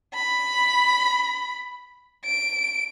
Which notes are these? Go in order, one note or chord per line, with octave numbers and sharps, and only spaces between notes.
B5
D7